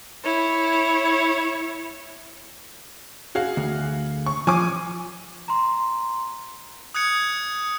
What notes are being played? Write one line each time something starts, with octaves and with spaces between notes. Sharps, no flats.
E4 C#5
F#4 G#4 F5
D2
C#6
F3 G#5 C#6 D6
A#5 C6
D#6 F#6 G#6 C#7